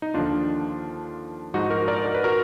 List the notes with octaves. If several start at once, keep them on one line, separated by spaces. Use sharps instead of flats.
D#4
D#2 D3 F3 D4 F4
G#2 F3 D#4 F#4
F#4 A#4
A#4 D5
A#4
B4
F#4 A#4